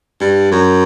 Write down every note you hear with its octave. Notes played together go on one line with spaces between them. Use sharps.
G2
F#2